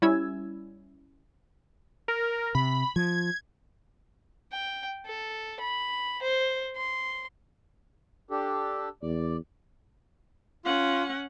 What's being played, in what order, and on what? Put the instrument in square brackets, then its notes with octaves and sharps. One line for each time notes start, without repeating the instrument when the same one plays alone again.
[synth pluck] G3 C#4 E4 E6 G#6
[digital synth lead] A#4
[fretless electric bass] C3 [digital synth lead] B5
[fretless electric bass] F3 [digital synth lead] G#6
[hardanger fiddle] G5
A4
B5
C5
C6
[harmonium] D4 G4 A4
[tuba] E2 [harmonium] D5
[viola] C#4 F#5 [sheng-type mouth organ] F4